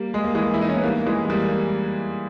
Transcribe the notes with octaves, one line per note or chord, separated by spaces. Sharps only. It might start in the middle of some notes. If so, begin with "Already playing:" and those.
Already playing: G3 A#3
G#3
A#3
E3 G#3
E4
D#4
C#4
B3
G3 A#3
E3 G#3
G#3
G3 A#3